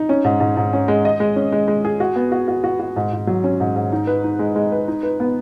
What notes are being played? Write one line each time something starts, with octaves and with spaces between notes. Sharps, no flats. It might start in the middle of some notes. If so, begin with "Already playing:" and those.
Already playing: D#4
C#4
G#2
G#2
G#2
C#4
G#3
D#5
G#3
C#4
G#3
G#3
G#4
F#4
B3
F#4
F#4
F#4
F#4
G#2
G#2
F#3
C#4
G#2
G#2
D#4
B4
D#4
G#3
G#3
B4
D#4
B4
B3